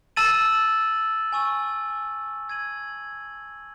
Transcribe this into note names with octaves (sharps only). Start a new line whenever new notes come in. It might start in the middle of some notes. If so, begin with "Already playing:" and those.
A5 E6 A6 D#7 F#7
G#5 C#6 E6
E6 G#6 D#7 F#7